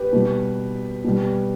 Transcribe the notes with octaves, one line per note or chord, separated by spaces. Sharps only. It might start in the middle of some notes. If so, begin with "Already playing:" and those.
Already playing: G4 B4
B2 G3
B2 G3